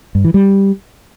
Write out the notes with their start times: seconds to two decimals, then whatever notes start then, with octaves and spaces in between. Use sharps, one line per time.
0.15 G2
0.24 E3
0.34 G3